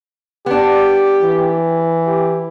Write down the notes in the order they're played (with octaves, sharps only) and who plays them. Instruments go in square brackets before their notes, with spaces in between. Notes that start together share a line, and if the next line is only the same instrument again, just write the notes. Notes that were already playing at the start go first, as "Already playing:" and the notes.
[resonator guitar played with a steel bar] B3 D4 [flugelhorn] G4
[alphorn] E3
[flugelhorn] G4